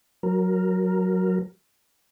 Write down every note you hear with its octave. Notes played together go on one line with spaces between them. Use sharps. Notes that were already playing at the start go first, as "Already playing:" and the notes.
F#3 A#4